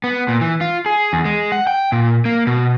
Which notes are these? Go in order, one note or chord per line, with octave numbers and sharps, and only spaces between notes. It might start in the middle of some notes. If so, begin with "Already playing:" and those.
B3
A#2
E3
F4
G#4
E2
G#3
F#5
G5
A#2
A#3
B2